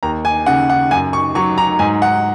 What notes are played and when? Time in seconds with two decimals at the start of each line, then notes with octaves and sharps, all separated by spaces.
0.03 D#2 A#5
0.25 G#5
0.46 C#3 F#5
0.70 F#5
0.91 F#2 G#5
1.13 C#6
1.35 F#3 C#6
1.58 A#5
1.79 G#2 G#5
2.02 F#5